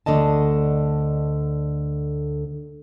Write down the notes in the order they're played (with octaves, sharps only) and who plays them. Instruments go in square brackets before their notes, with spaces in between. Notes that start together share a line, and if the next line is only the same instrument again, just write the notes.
[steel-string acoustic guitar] D2 D3 A3 D#5 A5